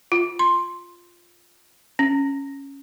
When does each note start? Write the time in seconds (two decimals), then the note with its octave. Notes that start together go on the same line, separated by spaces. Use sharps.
0.12 F4
0.39 C6
1.99 C#4